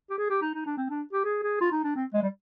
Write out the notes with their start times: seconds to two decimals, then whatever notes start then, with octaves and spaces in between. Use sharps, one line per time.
0.10 G4
0.18 G#4
0.30 G4
0.42 D#4
0.54 D#4
0.66 D4
0.77 C4
0.90 D4
1.13 G4
1.24 G#4
1.43 G#4
1.61 F4
1.72 D#4
1.84 D4
1.96 C4
2.14 G#3
2.23 G3